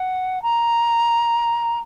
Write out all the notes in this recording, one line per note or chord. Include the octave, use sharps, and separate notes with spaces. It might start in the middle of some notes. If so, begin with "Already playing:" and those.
Already playing: F#5
A#5